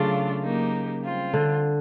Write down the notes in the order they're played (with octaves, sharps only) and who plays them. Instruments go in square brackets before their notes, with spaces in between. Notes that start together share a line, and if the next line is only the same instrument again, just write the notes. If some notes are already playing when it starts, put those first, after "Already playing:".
Already playing: [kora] C#3 [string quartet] F#3 A3 D4 F4
[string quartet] F#3 A#3 D#4 G4
G3 C4 F4
[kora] D3